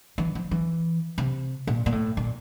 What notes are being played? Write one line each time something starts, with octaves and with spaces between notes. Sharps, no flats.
E3
F3
E3
C3
A#2
A#2
A2
A#2